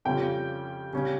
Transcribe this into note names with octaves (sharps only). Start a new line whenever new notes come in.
F2 C#3 G3 C#4 F4 G5
C#3 G3 C#4